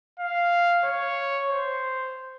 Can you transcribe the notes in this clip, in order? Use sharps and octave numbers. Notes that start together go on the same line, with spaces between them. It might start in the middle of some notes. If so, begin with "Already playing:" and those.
F5
C#5
C5